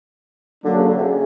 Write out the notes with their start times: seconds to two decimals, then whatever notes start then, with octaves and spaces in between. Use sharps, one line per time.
0.65 D3 F#3 A#3 D4
0.76 C#3
0.86 D3
0.97 C3
1.03 C#3